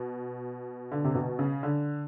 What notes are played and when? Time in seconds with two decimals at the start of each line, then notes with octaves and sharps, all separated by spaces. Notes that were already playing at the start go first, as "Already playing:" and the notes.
Already playing: B2
0.92 D3
1.04 C3
1.15 B2
1.39 C#3
1.63 D3